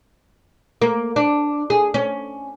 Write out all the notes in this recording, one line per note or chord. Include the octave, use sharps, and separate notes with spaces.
A#3
D4
G#4
C#4